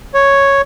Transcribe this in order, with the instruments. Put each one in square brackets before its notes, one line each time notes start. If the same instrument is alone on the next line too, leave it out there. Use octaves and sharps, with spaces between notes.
[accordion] C#5